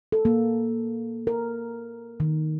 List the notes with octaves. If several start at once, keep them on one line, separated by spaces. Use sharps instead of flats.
A4
A#3
A#4
D#3